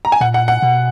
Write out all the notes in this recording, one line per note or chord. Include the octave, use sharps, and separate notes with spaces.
A#5
G#5
A#2 F#5
F#5
F#5
B2